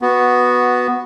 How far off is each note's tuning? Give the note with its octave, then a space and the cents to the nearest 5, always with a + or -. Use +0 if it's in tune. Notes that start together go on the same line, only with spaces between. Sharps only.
B3 +0 F#4 -5